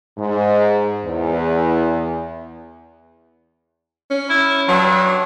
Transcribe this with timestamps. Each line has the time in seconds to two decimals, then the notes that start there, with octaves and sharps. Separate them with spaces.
0.18 G#2
1.04 E2
4.10 C#4
4.30 E4
4.68 G2 F#3